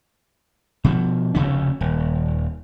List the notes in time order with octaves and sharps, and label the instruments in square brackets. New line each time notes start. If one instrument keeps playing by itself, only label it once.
[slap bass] B2 F3
F1 D2 C#3 C#4
D#1